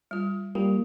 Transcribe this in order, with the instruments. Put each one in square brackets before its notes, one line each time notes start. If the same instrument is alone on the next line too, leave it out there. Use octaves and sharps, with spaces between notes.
[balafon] G3 F4
[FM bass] G3 [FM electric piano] A#3 [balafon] F4